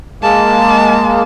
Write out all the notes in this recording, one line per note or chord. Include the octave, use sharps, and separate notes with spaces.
G#3 A#3 A5